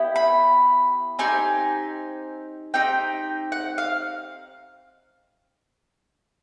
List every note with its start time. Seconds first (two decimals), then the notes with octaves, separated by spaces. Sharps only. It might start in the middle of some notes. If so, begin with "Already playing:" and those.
Already playing: B3 E4 G4
0.16 B5
1.19 C4 D#4 G4 G#5
2.74 C4 D#4 G4 G5
3.52 F#5
3.78 F5